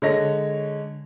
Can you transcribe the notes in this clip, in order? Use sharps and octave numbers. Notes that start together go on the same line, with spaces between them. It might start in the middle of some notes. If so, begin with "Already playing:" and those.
D3 G#3 C#5 A#6